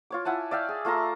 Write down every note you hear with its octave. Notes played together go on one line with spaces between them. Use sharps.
F4 C#5 D6
E4 F#5 G#5 A5
D5 E5 F5 G5
G#4
A3 F4 A5 A#5